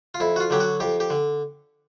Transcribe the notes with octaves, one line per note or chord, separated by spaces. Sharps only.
F4
F2 E4
F#4
F4
D3 F#3 G4
F#4
F2 G4
G4
D3